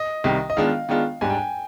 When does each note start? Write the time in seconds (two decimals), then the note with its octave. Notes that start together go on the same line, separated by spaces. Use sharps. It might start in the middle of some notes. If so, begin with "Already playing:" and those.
Already playing: D#5
0.24 C2 C3 D#3 G3
0.50 D#5
0.57 D#3 G#3 B3 D4 F4 F5
0.89 D#3 G#3 B3 D4 F4
1.21 G#2 G3 D4 G#5
1.30 G5
1.37 G#5